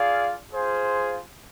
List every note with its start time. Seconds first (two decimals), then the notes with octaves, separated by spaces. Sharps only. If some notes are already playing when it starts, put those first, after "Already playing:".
Already playing: F4 G#4 D5 F5
0.51 F4 G#4 C5